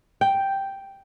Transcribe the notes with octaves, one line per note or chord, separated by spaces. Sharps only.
G5